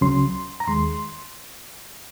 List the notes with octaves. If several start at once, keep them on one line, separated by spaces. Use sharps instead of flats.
C#2 C#3 F#3 C#4 C6
A#5
D#2 D#3 G#3 C6